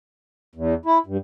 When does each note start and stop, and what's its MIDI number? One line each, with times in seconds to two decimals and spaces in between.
0.55 0.74 40
0.85 0.98 64
1.06 1.17 43